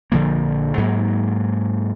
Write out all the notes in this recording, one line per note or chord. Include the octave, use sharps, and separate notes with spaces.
A#1 D3 F3 A#3
G#2 F#3 A#3